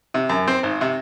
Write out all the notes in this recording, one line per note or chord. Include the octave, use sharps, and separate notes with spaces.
C3
F#2
C4
G#1
C3